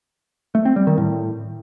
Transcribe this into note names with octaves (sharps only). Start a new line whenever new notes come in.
A3
C4
G3
D#3
A2